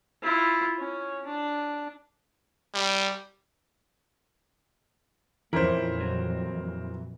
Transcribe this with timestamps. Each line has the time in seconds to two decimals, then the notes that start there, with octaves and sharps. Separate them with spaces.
0.23 E4 F4
0.78 C#4
1.26 D4
2.75 G3
5.53 F2 A#2 E3 F3 C#4 E4 A#4 C5
6.00 F#3